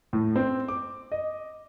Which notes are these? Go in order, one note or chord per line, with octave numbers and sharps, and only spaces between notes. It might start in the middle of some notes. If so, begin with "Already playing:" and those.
A2
C4
D6
D#5